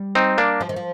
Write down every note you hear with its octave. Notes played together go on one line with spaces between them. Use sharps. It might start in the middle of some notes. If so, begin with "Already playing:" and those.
Already playing: G3
C4 D#4
A#3 D4
F3
D#3
F3